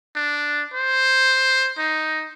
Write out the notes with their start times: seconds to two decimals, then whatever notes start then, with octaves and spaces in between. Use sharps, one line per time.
0.16 D4
0.74 C5
1.78 D#4